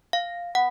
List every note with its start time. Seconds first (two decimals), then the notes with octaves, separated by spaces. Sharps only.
0.13 F5
0.55 B3 F#5